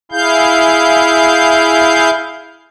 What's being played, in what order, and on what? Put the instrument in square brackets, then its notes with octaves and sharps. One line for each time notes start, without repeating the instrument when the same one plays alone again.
[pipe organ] E4 G#4 F5 G6